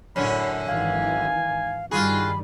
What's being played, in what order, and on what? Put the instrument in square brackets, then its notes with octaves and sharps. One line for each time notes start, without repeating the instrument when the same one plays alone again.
[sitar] F#2 D3 C#4 [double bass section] A2 [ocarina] C#5 [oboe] B5
[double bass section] G#1 D#3 E3 [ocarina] F5 [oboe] G#5
[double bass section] G2 D#3 G3 [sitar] F4 G#4 [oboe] F#4 [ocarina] B5